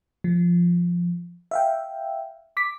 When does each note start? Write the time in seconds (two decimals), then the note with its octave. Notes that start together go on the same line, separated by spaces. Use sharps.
0.24 F3
1.51 E5 F5 G5
2.57 D6 B6